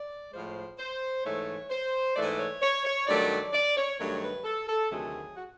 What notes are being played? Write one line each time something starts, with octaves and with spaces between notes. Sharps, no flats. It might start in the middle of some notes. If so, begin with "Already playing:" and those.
Already playing: D5
A2 F3 G#3 C5
C5
G#2 E3 A3 C#5
C5
G#2 E3 A3 D5
C#5
C#5
C#5
G2 D#3 F#3 A3 D5
D5
D5
C#5
G2 D#3 F#3 A3 C#5
B4
A4
A4
D2 C3 D#3 F#3 A3 G#4
F#4